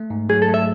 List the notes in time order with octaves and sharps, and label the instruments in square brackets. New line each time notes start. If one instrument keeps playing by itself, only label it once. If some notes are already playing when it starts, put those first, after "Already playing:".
Already playing: [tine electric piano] A3
G#2
[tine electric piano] F#3 [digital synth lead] G#4
[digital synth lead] A4
[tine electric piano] A3
[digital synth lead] E5